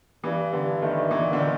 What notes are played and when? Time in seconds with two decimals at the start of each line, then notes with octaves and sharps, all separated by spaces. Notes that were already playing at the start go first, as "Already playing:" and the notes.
0.24 G2 E3
0.52 G2 D3
0.81 D#3 A3
1.11 A#2 E3
1.33 D3
1.39 A#2 D#3